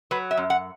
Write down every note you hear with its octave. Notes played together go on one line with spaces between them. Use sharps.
F#3 B4
E5
F#2
F#5